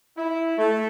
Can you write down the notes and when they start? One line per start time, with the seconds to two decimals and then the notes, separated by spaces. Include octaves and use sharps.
0.17 E4
0.58 A3